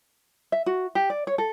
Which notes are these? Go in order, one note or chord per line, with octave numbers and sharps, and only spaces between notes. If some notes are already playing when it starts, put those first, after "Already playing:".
E5
F#4
G4
D5
C#5
A4